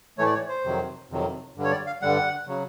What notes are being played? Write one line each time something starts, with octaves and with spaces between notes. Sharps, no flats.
A2 E3 A3 C#5
D5
C#5
C5
F2 C3 D#3 F#3
F2 C3 D#3 F#3
G2 D3 G3
C#5
D5
F5
G2 D3 G3 F#5
C#3 F#3